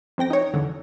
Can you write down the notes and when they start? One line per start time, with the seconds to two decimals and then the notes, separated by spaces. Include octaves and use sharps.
0.18 F2 C4 G5 A#6
0.30 D#4 C#5
0.54 E2 D3